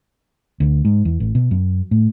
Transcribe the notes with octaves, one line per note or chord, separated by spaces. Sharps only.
D2
G#2
E2
A1
B2
F#2
A2